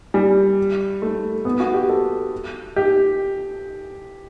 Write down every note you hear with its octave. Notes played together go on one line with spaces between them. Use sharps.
G3
A3
B3
F#4
G4
A4
G4